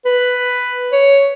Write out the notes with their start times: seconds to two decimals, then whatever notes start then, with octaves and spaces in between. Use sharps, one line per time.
0.05 B4
0.92 C#5